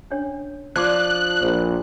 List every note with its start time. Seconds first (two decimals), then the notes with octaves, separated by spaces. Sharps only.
0.10 C#4 D4 C#5
0.76 F3 D4 D5 D6 F#6
1.42 A#1 C5